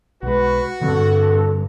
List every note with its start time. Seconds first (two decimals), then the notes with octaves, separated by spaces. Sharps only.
0.23 B1 G#3 F#4 B4
0.81 G2 D3 G3 C4 A4